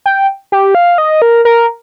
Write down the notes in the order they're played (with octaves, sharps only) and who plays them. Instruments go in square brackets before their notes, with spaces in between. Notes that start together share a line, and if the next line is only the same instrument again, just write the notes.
[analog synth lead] G5
G4
F5
D#5
A#4
A#4